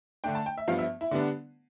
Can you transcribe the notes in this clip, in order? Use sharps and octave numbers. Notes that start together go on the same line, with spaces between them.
D3 A3 D4 G5
A5
G5
E5
G2 F3 B3 F5
E5
E4
D3 G3 B3 D4